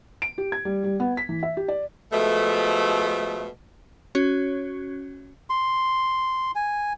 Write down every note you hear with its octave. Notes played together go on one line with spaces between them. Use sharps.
D7
G4
G#6
G3
G3
B3
B6
E3
E5
G4
D5
B2 F3 G#3 A3
C#4 F#4 C#5
C6
G#5